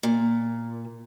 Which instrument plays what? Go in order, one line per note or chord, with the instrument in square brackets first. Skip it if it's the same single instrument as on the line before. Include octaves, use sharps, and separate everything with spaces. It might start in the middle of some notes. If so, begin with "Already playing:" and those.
[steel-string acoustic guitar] A#2